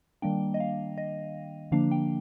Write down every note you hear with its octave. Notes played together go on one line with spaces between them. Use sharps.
D#3 G3 A#3 D4 G5
D#5
F5
D#5
D3 F3 A#3 D4 F5
G5